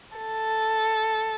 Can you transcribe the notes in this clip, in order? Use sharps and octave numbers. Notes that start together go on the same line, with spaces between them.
A4